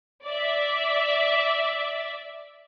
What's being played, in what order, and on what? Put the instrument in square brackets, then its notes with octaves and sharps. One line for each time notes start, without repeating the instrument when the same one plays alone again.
[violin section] D5 E5